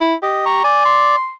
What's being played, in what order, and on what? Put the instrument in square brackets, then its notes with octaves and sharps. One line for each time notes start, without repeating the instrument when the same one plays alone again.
[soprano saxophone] E4
[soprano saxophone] G4 [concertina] D#5
[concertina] A#5 C#6
[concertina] D5 [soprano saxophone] G#5
[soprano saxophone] C6